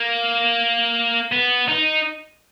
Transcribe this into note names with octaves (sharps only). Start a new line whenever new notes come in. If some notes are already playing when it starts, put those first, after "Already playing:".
Already playing: A#3
B3
D#4